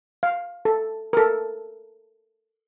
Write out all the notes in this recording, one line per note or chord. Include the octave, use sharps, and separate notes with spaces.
F5
A4
A4 A#4